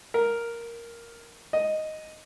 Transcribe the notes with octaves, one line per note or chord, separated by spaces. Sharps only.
A#4
D#5